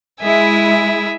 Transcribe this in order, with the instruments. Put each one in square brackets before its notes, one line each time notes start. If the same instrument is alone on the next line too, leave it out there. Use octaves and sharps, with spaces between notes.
[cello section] G#3 E4 [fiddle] G#4 E5